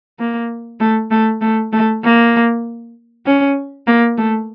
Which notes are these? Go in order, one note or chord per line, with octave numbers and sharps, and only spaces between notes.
A#3
A3
A3
A3
A3
A#3
C#4
A#3
A3